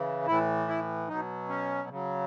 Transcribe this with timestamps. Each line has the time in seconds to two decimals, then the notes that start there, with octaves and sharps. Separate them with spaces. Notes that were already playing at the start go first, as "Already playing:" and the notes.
Already playing: C#3 E3
0.27 A2 E3 E4
0.68 E4
1.08 B2 F#3 D#4
1.48 C#4
1.89 C#3 F#3